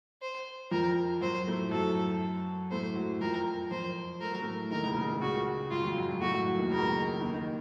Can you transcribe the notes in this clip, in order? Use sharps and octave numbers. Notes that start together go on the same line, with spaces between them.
C5
F2 F3 A#4
F#2 F#3 C5
A2 A3
F#2 F#3 A4
A2 A3 C5
F#2 F#3
F2 F3 A#4
F2 F3 C5
A3 A#4
F#3
A2 A3
D#2 D#3 A#4
C#2 C#3
C#2 C#3
A#2
C#2 C#3 F#4
F#2 F#3 F4
F2 F3
F#2 F#3
F#2 F#3
A2 A3 F#4
F#2 F#3
F#2 F#3
D#2 D#3
C#2 C#3 A#4
D#2 D#3
D#3